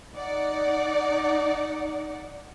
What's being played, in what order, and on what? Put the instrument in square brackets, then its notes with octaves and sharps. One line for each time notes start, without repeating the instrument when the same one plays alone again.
[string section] D#4 D5 F#5